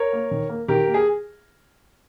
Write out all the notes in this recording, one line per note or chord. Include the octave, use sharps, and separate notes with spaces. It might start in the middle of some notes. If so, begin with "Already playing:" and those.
Already playing: A#4 C#5
A#3
D#3
A#3
D#3 G4 A#4
A#3
G#4